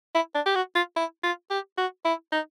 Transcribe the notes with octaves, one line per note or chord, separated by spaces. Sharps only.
E4
D4
G4
F#4
F4
E4
F4
G4
F#4
E4
D#4